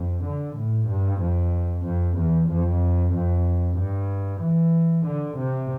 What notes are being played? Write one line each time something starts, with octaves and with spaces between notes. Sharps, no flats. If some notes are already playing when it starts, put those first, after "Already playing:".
Already playing: F2
D3
A2
G2
F2
F2
E2
F2
F2
G2
E3
D3
C3